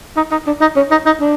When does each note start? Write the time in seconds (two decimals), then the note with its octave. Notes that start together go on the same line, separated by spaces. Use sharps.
0.17 D#4
0.32 D#4
0.47 D4
0.61 D#4
0.76 C#4
0.91 D#4
1.06 D#4
1.21 D4